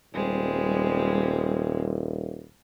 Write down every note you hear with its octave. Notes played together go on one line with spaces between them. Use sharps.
D#1 G3 G#3 C4